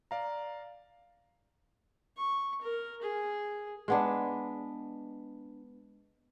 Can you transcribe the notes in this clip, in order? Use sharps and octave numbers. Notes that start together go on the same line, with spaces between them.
D5 F5 A#5
C#6
A#4
G#4
G#3 B3 D4